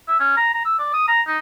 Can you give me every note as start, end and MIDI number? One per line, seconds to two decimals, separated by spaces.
0.08 0.19 76
0.20 0.35 61
0.37 0.53 82
0.54 0.64 82
0.65 0.78 88
0.79 0.92 74
0.94 1.03 87
1.08 1.21 82
1.28 1.38 63